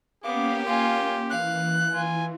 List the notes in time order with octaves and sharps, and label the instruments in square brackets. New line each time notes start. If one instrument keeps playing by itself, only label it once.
[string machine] A#3 C#4 [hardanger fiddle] B3 D6 [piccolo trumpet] G4 [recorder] F5
[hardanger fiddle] F4 G#5 [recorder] F5
[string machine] E3 [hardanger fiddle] F5 [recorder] F#6
[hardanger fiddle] F4 [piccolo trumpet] G#5